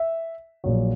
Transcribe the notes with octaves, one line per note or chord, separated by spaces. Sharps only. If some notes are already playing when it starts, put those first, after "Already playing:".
Already playing: E5
A#1 A#2 F#3